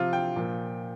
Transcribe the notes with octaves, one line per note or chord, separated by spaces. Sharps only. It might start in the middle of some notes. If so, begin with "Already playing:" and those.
Already playing: C3 F3 F4
G5
A#2 F3